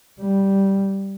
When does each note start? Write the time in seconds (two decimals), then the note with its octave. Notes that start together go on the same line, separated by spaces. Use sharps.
0.21 G3